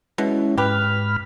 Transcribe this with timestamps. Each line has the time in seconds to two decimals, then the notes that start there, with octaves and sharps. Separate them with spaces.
0.18 B2 G#3 C#4 E4
0.57 G#2 G4 B4 B5 F6